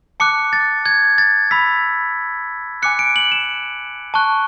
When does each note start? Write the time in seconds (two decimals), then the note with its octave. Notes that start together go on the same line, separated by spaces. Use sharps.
0.20 A5 D6 F#6 C#7
0.53 A6
0.86 G#6
1.18 A6
1.51 B5 E6 B6
2.82 G#5 D6 F#6 C#7
2.99 D7
3.16 F#7
3.32 E7
4.14 A5 C#6 F#6